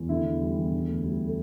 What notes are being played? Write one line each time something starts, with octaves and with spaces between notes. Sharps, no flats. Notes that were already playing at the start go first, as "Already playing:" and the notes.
Already playing: E2
D3 E4
E2
G3
E2
D3
D2
G3
A4